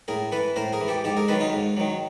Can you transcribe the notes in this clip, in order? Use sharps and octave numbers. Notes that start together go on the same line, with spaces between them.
A2 G#4 A#4
E3 A4 B4
A2 A#4 C5
G#4 A#4
E3
G4 A4
G#2 G4 A4
G#4 A#4
D#3 F#3 A4 B4
D#4 F4
G#2
D#3 F#3